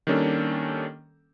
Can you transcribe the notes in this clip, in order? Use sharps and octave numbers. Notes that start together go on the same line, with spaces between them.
D#3 G3 A#3 C#4 D4 A4